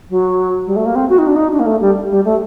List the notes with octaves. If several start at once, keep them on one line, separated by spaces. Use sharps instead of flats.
F#3
G3
A3
A#3
C4
F#4
D#4
D4
D#4
D4
A#3
A3
G3
G3
A3